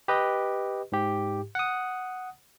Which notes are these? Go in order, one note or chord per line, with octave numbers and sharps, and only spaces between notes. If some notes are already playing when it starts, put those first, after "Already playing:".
G4 B4 D#5
G#2 G4
F#5 D#6